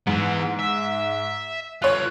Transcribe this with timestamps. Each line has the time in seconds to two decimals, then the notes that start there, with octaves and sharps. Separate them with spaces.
0.07 G#2 E3 B3
0.60 E5
1.82 D3 F4 C#5 F#6